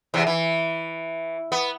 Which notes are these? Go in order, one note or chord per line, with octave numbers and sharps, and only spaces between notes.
E2 C3
E3
B3